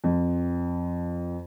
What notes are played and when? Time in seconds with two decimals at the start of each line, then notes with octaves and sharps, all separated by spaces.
0.04 F2 F3